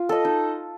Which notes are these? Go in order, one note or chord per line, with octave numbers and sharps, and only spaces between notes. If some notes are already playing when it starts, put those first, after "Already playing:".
Already playing: F4 F5
A4 D#5
D#4